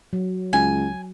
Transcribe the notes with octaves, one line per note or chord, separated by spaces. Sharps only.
F#3
C#2 G#5